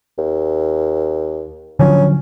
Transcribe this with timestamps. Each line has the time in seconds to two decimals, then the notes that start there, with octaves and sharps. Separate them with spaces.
0.18 D#2
1.80 D3 F3 F#3 C#4